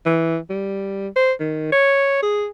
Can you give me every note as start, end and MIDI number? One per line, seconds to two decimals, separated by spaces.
0.06 0.38 52
0.50 1.08 55
1.16 1.33 72
1.40 1.71 51
1.72 2.21 73
2.22 2.47 68